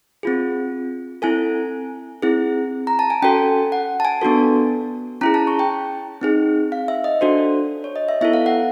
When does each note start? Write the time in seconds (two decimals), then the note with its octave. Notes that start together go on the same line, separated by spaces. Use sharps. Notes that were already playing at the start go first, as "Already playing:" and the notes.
0.23 C4 F4 G#4
1.22 C4 E4 A4 G#5
2.22 C4 E4 G#4
2.87 A#5
2.99 A5
3.10 G#5
3.22 C#4 F#4 A4 G5
3.72 F#5
4.00 A5
4.05 G#5
4.21 B3 D4 F#4 A4
5.21 C#4 E4 G#4 A#5
5.34 A5
5.47 C#6
5.59 G5
6.21 C4 D#4 G#4
6.72 F5
6.88 E5
7.04 D#5
7.21 D4 F#4 A4 C5
7.84 C#5
7.96 D#5
8.09 E5
8.21 B3 E4 A4 E5
8.33 F5
8.46 F#5